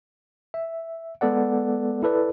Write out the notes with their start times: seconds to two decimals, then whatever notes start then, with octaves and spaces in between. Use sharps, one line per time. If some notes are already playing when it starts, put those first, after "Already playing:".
0.54 E5
1.21 G#3 B3 A4 D5 F#5
2.03 E4 A4 B4 D5